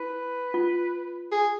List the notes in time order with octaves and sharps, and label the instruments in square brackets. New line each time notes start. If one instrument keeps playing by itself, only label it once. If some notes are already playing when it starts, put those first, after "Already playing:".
Already playing: [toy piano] E4 [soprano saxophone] B4
[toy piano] F4
[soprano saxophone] G#4